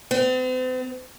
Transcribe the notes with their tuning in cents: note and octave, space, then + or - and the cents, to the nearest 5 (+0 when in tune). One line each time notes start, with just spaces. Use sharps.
C4 -45